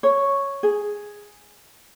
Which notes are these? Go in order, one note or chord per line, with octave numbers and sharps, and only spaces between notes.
C#5
G#4